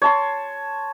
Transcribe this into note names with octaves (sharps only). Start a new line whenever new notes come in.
C#5 A5 C6